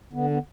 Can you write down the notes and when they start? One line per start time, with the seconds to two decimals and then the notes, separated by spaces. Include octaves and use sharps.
0.13 D3 B3
0.30 B3